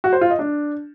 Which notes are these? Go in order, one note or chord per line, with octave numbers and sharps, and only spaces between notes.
F#4
C5
F4
D#5
D4